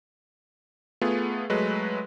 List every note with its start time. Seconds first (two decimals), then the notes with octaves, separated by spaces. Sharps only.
1.01 A3 B3 F4 G#4
1.50 F#3 G#3 A3 B4